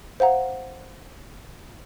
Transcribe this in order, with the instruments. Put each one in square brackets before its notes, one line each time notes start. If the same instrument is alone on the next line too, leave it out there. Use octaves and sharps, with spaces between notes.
[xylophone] C5 F5 F#5 A#5